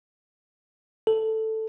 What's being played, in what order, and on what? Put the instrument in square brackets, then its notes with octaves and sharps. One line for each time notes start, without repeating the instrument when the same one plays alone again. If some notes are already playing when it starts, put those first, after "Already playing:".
[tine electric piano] A4